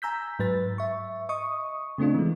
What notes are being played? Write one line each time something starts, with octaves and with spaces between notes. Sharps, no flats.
G#5 A#5 E6 G6 B6
G#2 F#3 B4 A6
E5 C#6
D#5 C#6 D#6
C#3 A3 C4 D4 F4
E3 G#3